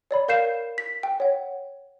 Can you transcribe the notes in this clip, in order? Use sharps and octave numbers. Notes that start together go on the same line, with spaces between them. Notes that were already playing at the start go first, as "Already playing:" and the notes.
C#5 D5 B5
A#4 F5 G6 C7 E7
B6
G5
C#5 F#5